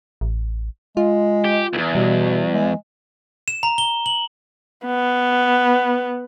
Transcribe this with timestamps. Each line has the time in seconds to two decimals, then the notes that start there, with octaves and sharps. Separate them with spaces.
0.21 A1
0.97 G#3 F4
1.45 G4
1.73 B1 E2
1.95 B2 G3
2.54 G#3
3.48 E7
3.63 A#5
3.78 G7
4.06 F#7
4.86 B3